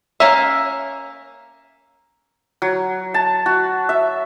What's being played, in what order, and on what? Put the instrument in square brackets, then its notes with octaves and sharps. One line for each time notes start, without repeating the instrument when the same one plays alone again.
[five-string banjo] A#3 C#4 E5
[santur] F#3
A5
F#4
E5